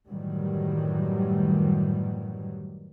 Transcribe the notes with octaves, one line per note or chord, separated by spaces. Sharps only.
F#2 A2 D#3 E3 F#3 G3